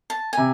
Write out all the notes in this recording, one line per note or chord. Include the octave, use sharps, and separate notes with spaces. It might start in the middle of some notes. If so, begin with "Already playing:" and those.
A5
C3 G#5